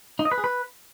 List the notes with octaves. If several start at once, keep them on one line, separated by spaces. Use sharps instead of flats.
D#4
D#5
B4
G#4
B4